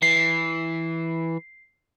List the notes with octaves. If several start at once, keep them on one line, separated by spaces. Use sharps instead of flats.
E3 C7